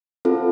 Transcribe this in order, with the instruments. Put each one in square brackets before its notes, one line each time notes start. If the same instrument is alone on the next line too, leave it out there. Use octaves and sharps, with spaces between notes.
[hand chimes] C4 F4 A4